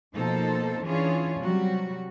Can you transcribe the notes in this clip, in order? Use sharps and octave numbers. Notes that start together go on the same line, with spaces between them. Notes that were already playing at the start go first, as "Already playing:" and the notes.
B2 F3 A#3 D#4 A4 C5
E3 C#4 D4 F4 G#4 C#5
C3 F#3 G3 F#4